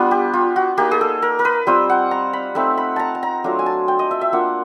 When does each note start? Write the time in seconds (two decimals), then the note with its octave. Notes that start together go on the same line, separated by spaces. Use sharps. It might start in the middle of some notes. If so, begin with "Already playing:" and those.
Already playing: G3 B3 D4 F4
0.11 G4
0.33 F4
0.56 F#4
0.78 A#3 D#4 G4
0.91 G#4
1.01 A4
1.22 A#4
1.39 A#4
1.45 B4
1.67 G3 C4 F4 C5
1.90 F#5
2.11 A#5
2.33 B5
2.55 A3 C4 D#4 B5
2.77 B5
2.96 A5 A#5
3.15 A5
3.23 A#5
3.44 F#3 A3 D4 F4
3.59 G#5
3.66 A5
3.88 G5
3.99 D#5
4.11 E5
4.21 E5
4.32 A#3 D4 F4 F#5